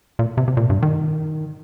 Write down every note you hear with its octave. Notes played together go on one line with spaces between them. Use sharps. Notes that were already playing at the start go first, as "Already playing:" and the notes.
A#2
C3
C3
A#2
G2
D#3